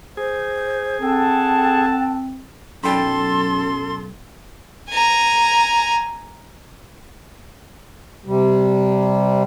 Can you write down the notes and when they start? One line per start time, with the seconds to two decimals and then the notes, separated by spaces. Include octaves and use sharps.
0.17 G#4 C5
1.02 C4 A4 F#5 G5 A5
2.84 B1 F#2 A4 G5 B5 C6
4.90 G#5 A#5
8.26 C3 G3